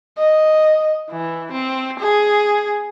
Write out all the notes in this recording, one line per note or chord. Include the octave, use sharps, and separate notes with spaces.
D#5
E3
C4
G#4